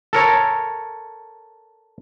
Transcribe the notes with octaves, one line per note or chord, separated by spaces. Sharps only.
A4 A#4 C#5